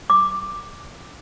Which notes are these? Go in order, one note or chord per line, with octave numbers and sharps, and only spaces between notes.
D6